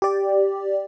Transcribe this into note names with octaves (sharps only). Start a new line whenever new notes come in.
G4 D5